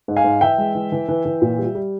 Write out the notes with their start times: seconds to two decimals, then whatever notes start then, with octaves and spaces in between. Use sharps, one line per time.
0.08 G#2
0.16 F5 G#5
0.24 G#2
0.41 E3 E5 G5
0.58 G#3
0.75 E3
0.92 E3
1.09 E3
1.26 E3
1.42 A#2
1.59 G3
1.75 G3